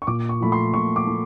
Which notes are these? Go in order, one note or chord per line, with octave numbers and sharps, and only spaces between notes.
C#6
A#2 D6
C#6
F3 A3 B5
C6
A#2 C#6
D6
A3